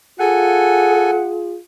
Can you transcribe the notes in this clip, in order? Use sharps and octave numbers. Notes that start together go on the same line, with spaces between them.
F4 G#4 A4 F#5 G#5